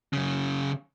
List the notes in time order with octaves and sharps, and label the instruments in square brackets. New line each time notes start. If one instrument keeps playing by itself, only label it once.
[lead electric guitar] F#2 C#3